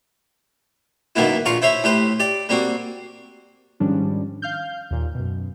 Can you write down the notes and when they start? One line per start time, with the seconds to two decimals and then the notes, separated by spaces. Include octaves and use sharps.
1.16 F#2 B2 D#3 A#3 B3 E4
1.46 A#1 F4 F5 A#5 C#6
1.62 E4 C5 C#5 E5
1.84 A2 G4 B4 C5
2.20 G4 D5
2.49 G3 A#3 C4 F#4
3.80 G#2 D#3 F3 G3 C#4 D4
4.42 F5 F6 G6
4.91 D#2 A#2
5.15 F#2 B2